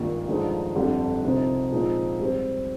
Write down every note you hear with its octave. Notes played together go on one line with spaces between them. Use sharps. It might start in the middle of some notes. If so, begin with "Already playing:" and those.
Already playing: G#1 G2 D#3 A#3 F4
G2 D3 F3 G#3 D#4
G1 F2 D3 G3
C2 C3 F3 C4 D#4
A#2 F3 G#3 C4 D#4
G#2 G3 C4